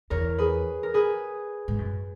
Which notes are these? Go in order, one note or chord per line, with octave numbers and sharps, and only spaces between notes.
E2 A#4 C#5
G#4 B4
A#4
G#4 B4
G#2
F#2